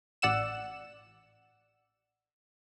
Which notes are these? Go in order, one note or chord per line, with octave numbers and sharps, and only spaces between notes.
A1 D5 F#5 E6 E7